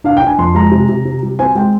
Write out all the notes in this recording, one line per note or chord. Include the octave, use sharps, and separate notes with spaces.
D4 F5
G5
D4
G#5
F2 C6
G#3 A#5
C3
C3
C3
G3
C4 G#5
G#3 G5